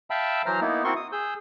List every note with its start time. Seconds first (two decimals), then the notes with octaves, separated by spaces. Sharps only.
0.10 E5 F5 G5 A5 B5 E6
0.46 E3 F#3 C5 A#5 F6
0.61 A#3 B3 D#4 E4
0.84 C4 E4 F#4 A#4 C6 C#6
0.96 D#6
1.12 G#4 E6 G6